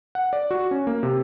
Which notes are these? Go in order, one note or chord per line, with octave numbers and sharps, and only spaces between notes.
F#5
D5
F#4
C#4
A#3
C3